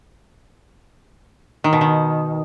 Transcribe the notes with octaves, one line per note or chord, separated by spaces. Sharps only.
D#3
B2
D#3